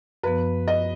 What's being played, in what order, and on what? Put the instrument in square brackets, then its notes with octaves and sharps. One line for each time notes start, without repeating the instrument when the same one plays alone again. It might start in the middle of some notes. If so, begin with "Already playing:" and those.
[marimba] F#2 F3 B3 [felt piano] B4
[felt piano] D#5